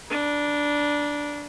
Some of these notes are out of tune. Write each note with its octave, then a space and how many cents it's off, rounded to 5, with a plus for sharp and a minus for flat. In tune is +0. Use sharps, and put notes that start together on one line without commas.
D4 -5 A#5 +45